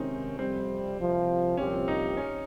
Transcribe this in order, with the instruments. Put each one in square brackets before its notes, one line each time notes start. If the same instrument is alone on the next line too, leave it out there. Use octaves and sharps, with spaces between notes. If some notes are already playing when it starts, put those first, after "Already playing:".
Already playing: [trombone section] C3 D#3 G#3 C#4 [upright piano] C4 D#4
[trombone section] F2 C3 G3 [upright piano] C4
[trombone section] C2 C3 F3
[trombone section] C2 A#2 F3 C4 G4 [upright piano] C#4
[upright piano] D#4
C#4